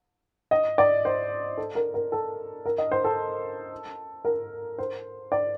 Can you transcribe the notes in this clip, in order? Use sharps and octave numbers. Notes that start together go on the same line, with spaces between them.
D#5
D5
C5
A4
A#4
A#4
A4
A#4
D#5
C5
A4
A#4
C5
D5